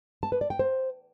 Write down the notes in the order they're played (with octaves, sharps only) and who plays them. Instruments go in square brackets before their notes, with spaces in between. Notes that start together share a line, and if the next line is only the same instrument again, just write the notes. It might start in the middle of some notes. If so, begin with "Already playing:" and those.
[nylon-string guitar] A5
B4
D5
G5
C5